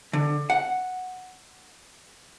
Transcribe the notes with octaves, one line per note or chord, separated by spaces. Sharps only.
D3
F#5